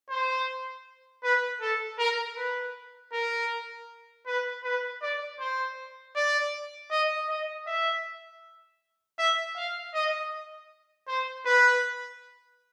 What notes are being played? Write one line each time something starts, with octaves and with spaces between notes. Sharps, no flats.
C5
B4
A4
A#4
B4
A#4
B4
B4
D5
C5
D5
D#5
D#5
E5
E5
F5
D#5
C5
B4